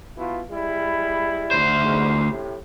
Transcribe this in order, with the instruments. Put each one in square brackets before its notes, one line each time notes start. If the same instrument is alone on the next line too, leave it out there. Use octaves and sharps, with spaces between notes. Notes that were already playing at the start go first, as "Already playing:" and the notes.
[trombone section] B2 E4 F4
G3 G#3 E4
[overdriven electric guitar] D2 C5
[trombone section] E2 G#2
A2 C3